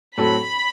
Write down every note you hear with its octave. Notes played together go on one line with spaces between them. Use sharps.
A2 F#3 C4 F#4 A4 B5